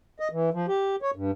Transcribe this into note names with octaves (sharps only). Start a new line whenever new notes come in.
D#5
E3
F3
G4
C#5
G2